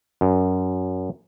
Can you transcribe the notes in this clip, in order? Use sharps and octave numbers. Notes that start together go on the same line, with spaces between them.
F#2